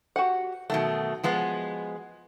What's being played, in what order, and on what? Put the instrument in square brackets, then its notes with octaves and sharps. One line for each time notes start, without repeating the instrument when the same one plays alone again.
[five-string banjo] F#4 G4 F#5
[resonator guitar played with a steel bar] B2 D#3 A3 [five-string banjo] F#3
[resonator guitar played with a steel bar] F3 G#3 B3